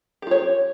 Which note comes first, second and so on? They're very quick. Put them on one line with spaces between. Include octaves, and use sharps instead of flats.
G4 F4 C#5